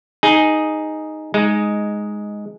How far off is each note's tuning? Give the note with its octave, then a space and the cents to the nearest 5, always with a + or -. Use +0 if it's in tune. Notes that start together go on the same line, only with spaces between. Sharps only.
D#4 +0 G#4 +0
G#3 +0 D#4 +0